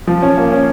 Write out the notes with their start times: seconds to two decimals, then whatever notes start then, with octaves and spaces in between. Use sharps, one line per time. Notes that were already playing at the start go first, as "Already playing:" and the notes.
0.07 F3
0.22 C#4
0.37 A#3
0.52 C#4